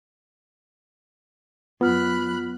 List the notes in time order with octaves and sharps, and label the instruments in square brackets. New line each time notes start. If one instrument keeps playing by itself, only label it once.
[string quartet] F#2 B5 F#6 [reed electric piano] B3 [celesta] F4 F6